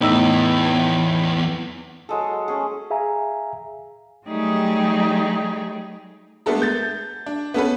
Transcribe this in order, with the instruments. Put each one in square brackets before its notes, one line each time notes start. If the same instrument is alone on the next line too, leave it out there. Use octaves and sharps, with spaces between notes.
[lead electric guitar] E2 B3 [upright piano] A2 D#4 E6
[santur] F#3 G#3 A4
A3 C#4 G#4
[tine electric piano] G#4 E5 F5 G#5 A#5
[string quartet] F#3 G3 A3 D#4 G4 G#4
[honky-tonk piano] G#3 A3 B3 D4 A4 A#4
G6 A6
D4
B3 C#4 A4 B4